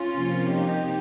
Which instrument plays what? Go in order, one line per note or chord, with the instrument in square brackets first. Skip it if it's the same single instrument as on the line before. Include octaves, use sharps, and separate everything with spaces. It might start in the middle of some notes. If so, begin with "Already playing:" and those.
Already playing: [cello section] C#4 F4
C3 F3 A#3
D#4 G4